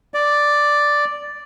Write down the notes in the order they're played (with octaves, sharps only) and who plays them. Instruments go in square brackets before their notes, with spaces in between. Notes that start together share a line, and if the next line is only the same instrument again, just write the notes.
[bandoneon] D5